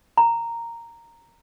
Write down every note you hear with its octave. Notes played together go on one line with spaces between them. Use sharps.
A#5